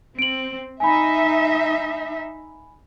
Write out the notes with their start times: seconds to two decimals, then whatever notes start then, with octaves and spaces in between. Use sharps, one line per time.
0.19 C4 D7 F#7
0.80 D#4 E5 G#5 B5